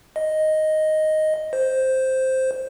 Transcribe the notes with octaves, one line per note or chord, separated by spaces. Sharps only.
D#5
C5